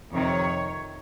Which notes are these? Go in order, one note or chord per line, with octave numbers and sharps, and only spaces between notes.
F2 C3 D#3 C#5